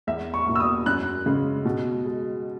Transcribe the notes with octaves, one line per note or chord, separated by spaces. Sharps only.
E2 E5
C#6
B2 A#3
E6
D#6
F#2 F#6
C#3 G#3
B2
G#3